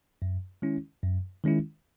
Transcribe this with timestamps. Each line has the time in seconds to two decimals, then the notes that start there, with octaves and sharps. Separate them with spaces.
0.22 F#2
0.62 D#3 G#3 C#4 E4
1.03 F#2
1.44 D#3 G#3 C#4 E4